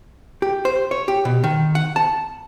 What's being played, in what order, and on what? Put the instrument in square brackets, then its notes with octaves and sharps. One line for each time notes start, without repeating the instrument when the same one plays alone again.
[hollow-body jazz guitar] G4
C5
C#5
G4
B2
D#3
F#5
A5